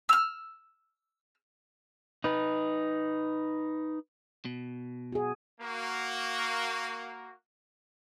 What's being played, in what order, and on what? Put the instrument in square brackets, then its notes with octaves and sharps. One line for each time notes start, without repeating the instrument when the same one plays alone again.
[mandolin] E6 F6
[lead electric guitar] D#4 B4
[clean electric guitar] B2
[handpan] F#4 G#4
[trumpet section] A#3 F#4